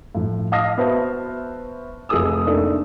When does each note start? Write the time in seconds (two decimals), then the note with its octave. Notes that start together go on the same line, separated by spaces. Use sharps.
0.15 A2 F3
0.52 D#5 F5 A5 D#6 F6 A#6
0.77 B3 F#4 B4 C5 E5 A5
2.09 F1 G#4 A4 D#6 E6
2.47 A3 A#3 D4 D#4